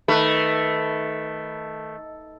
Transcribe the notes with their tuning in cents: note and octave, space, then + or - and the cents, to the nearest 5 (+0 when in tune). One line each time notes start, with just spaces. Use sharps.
D#3 +15 A3 +0 B4 +0